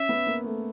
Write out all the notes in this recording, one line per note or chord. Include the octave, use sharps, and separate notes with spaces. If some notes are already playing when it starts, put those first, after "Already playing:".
Already playing: C#4 E5
B3
A#3
A3